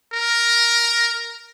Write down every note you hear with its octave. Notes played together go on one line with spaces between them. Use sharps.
A#4